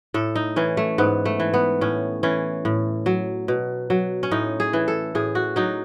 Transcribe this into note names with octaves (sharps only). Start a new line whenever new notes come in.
A2 A4
D#4
E3 C#4
A3
G#2 B3
A3
E3
B3
A2 C#4
E3 C#4
A2
F#3
B2
F#3
C#4
A2 D#4
G#4
E3
A4
A2 G#4
F#4
F#3 D#4